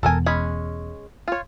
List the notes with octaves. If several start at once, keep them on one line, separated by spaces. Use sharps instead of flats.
E1 E2 A4 A#4 G#5
G#3 C#4 B5
F4 C#5